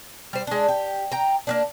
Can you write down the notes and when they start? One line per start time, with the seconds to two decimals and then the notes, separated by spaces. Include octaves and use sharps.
0.33 G3 C5
0.47 G#3 D4
0.68 G4
1.12 G5 A#5
1.47 A#3 B3 D4